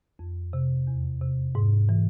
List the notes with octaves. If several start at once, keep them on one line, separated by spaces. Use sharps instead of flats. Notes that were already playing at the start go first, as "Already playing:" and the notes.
F2
C3
E2
C3
G#2
E3